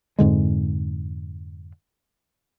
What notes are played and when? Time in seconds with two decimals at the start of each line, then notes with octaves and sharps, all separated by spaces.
0.19 F2 G#2 D3 G#3